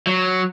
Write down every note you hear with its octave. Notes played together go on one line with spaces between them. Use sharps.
F#3